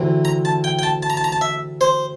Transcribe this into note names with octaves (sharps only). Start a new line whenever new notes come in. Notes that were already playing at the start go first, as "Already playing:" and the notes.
Already playing: D2 C3 E3
A#5
A5
G5
G5
A5
A5
A#5
A5
A#5
A5
E5
C5